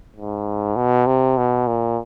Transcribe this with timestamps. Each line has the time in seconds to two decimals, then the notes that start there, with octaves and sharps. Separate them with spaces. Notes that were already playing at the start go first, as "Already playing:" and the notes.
0.16 G#2
0.76 B2
1.07 C3
1.37 B2
1.67 A#2